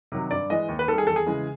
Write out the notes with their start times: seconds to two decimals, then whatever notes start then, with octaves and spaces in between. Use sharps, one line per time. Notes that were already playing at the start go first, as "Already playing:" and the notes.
0.12 C3 D#3 F#3
0.31 G2 D5
0.50 E3 G#3 D#5
0.69 D#2
0.79 B4
0.88 D#3 G3 A4
0.98 G#4
1.07 E2 A4
1.16 G#4
1.27 C#3 E3 G#3